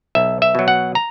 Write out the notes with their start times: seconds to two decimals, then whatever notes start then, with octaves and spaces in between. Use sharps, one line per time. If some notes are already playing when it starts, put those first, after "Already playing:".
0.15 B1 E5
0.42 E5
0.55 B2 F#3
0.68 F#5
0.95 A#5